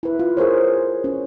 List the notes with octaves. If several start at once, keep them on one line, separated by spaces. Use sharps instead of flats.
E4 B4
F4
G#4 A#4 C5 C#5
C#4